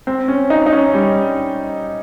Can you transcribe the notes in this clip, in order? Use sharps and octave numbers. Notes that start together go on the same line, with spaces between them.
C4
C#4
D#4
D#4
C#4
G3